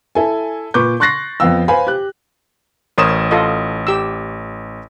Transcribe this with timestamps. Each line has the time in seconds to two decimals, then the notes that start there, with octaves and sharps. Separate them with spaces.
0.15 E4 A4 G#5
0.74 A#2 B4 C#6 D6 G6
1.00 C6 C#6 F#6 A6 A#6 C7
1.40 F2 B3 F5 G5 E6
1.68 B4 C5 F5 G#5 B5
1.87 G4 F#6
2.98 A1 A#4 C5 C#5 D#6 E7
3.31 F4 A4 D#5
3.87 G4 E6